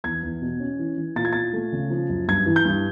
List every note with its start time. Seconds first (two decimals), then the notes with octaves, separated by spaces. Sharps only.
0.04 E2 G#6
0.23 E2
0.42 B2
0.60 C#4
0.79 E3
0.98 E3
1.16 A#2 A6
1.25 G#6
1.33 A#2 A6
1.53 A3
1.73 C#3
1.90 F3
2.09 F#2
2.28 G2 G#6
2.46 E3
2.56 G6
2.65 G2